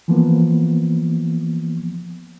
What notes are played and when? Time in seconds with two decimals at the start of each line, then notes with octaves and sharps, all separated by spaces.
0.08 E3 F3 A#3 B3